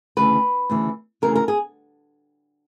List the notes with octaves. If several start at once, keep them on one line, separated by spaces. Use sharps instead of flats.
D2 C#3 E3 B4
D2 C#3 E3
D2 C#3 E3 A#4
A#4
G#4